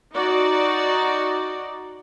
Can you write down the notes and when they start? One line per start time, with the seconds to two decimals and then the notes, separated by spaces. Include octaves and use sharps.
0.13 D#4 F#4 D5